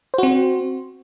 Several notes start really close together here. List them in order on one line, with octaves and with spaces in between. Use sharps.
C5 F#4 C4